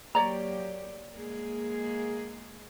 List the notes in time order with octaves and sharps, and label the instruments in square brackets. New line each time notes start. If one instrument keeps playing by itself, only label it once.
[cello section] F#3 A#3 G4 [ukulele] C#5 D5 A#5
[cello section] G#3 A#3 G#4